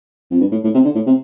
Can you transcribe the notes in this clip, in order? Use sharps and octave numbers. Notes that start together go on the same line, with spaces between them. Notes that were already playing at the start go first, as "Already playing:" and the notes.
F2
G2
A2
A2
C3
D3
A2
C3